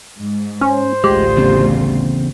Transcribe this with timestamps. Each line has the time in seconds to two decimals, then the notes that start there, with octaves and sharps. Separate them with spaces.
0.19 G#2
0.61 C#4 C5
1.04 A1 D2 G#3 F4 G4
1.37 E2 C#3 C4